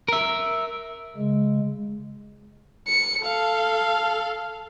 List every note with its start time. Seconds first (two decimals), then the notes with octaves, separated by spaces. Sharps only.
0.08 A#4 E5
1.17 C#3 G#3
2.87 C#7
3.24 A4 F5